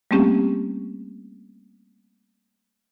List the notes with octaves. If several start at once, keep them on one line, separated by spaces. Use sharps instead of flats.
G3 A3 A#3 C4 C#4 G4